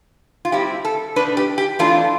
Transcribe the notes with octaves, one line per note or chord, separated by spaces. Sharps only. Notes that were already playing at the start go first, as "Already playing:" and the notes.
F4
A2 G3 C4 E4 G4
A4
B2 A3 D4 B4
G4
G4
F2 E3 A3 D4 F4